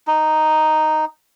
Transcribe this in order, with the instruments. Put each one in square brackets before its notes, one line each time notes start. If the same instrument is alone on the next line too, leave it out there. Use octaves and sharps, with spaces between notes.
[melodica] D#4